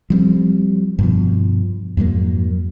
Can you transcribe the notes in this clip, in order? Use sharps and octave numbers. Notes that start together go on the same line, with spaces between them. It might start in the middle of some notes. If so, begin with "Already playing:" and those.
F3 G3 C4
G2 B2 F3
F2 G#2 F#3 A#3